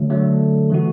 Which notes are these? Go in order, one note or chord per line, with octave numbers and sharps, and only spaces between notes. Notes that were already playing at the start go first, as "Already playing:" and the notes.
Already playing: D3 F#3 A3
D3 F#3 A3
E3 A3 F#4